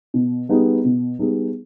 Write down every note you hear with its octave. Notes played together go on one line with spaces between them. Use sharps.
B2
G3 B3 D#4 G#4
B2
G3 B3 D#4 G#4